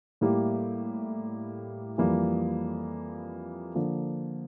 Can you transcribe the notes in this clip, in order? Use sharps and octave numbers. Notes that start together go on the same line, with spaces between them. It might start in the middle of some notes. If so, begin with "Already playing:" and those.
A2 G3 A#3 E4 G4
F2 E3 G3 A#3
D3 F3 A#3